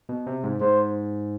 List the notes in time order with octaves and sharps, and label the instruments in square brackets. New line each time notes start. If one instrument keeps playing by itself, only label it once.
[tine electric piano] B2
C3
G#2
[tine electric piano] G#2 [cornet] C5